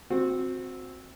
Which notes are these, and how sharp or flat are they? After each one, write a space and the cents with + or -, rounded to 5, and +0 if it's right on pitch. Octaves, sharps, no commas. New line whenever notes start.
C4 +0 F#4 -25